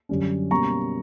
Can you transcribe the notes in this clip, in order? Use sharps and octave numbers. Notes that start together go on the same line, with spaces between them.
F#2 D3 G3 C#4
B2 G3 A#3 C#4 A#5 C#6